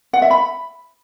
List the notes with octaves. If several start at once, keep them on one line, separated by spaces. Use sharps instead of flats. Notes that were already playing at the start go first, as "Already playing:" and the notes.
F#5
E5
B5